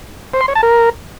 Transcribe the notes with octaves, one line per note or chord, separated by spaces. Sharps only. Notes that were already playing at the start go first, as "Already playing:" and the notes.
C5
C6
C#5
A5
A#4